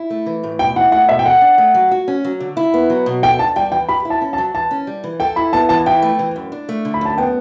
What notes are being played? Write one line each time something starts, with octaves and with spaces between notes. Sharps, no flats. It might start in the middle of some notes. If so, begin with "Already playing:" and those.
Already playing: E4
A3
E3
A2
B2 G5
E4 F#5
A3 F#5
B2 E5
G5
A4 F#5
D4
A3
F#3
F#4
C#4
F#3
D3
E4
B3
F#3
B2
A4 G5
D4 A5
G3 G5
E3 G5
G4 B5
E4
A5
C#4
A5
F#3
E3 A5
C#4
G3
E3
A4 G5
E4 B5
B3 A5
E3 A5
E4 G5
A3
E3
F#2
D4
A3
D3
B5
F#2 A5
B3 G5